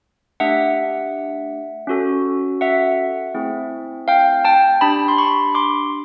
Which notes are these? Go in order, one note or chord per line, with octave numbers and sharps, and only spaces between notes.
A3 D4 G4 E5 F#5
C#4 F#4 A4
E5 F#5
A3 C4 E4 G#4
F5 G5
G5 A5
D4 G4 A5 B5
C6
B5 C#6
C6 D6